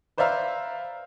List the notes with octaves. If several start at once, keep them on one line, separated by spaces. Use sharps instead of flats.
B4 C5 D5 E5 F5 A#5